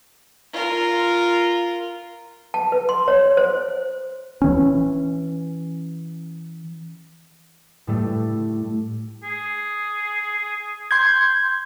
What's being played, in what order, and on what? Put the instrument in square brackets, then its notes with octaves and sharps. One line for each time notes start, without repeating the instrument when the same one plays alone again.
[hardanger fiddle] F4 A#4
[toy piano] A5
B4
C6
C#5
C5
[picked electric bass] E3 C#4
[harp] A2 G3 A3
[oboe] G#4
[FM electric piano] C6 G6 G#6